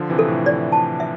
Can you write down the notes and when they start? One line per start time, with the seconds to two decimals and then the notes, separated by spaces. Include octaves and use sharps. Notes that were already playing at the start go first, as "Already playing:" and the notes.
Already playing: D3 F3
0.10 C3 E3
0.19 A4
0.28 A2 C3
0.46 D5
0.72 A5
1.00 E5